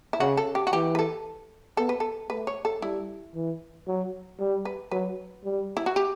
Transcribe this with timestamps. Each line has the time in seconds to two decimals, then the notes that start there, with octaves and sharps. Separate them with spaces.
0.13 E4
0.20 C#3 F#4
0.37 A4
0.55 G4
0.67 F#4
0.73 E3 G4
0.95 B4
0.99 A4
1.77 B3 A4
1.89 B4
2.00 A4
2.30 A3 B4
2.47 C#5
2.65 A4
2.82 G3 E4
3.35 E3
3.87 F#3
4.39 G3
4.65 B4
4.91 F#3 B4
5.44 G3
5.77 E4
5.86 F#4
5.96 G4